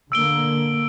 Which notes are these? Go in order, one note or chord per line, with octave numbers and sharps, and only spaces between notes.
D3 A#3 E6 D7 G7